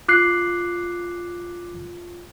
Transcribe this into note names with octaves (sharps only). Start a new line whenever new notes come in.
F4 D6 F#6 C7